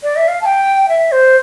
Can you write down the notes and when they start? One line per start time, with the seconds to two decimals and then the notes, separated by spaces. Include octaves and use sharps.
0.03 D5
0.16 E5
0.28 F5
0.41 A5
0.46 G5
0.89 E5
1.12 C5